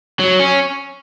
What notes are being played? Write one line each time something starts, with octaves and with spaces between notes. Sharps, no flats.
F#3
C#4